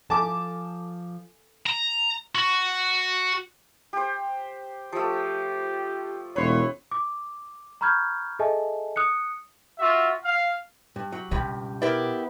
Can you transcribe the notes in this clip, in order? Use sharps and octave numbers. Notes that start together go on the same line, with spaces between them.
F3 A4 F5 G#5 A5 D6
A#5
F#4
G4 C5
F3 A3 G4
E1 B4 C#5 C6
D6
A#5 B5 C#6 F6 G6 G#6
G#4 A4 D#5 E5 G#5 A5
D#6 F#6 C#7
F4 F#4 E5
F5
G2
F#3 G4
C#2 G2 B2 B5
B3 E4 G4 A#4 B4 D5